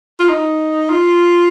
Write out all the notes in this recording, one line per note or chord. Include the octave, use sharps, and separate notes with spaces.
F4
D#4
F4